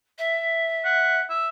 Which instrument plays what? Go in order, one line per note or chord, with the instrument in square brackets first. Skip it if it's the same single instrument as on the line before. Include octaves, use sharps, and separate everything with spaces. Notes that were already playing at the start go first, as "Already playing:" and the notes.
[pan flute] E5
[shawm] F#5
E5